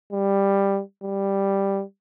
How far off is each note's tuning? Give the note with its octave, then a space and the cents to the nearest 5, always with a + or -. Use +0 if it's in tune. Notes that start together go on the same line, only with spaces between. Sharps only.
G3 +10
G3 +5